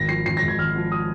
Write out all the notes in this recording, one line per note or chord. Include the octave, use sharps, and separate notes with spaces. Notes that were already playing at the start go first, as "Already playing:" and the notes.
Already playing: G#1 A#6
F3 C7
G#1 C7
A#6
G#2
G#6
G#1 F6
F3
D#6